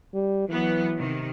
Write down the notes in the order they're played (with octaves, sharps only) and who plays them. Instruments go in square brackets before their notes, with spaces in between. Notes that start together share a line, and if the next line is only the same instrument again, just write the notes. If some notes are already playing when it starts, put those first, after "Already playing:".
[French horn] G3
[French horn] E3 [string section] F#3 B3
[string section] C3 D#3